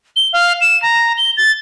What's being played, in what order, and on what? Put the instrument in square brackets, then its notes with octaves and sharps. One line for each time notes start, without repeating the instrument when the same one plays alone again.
[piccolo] G7
F5
E7
A#5
G7
A6